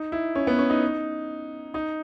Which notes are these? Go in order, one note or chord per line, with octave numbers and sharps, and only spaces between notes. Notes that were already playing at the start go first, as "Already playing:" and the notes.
Already playing: D#4
E4
C#4
B3
C#4
D#4
D#4